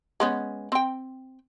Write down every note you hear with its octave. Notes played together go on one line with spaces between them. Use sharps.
G#3 B3 C#4
C4 G5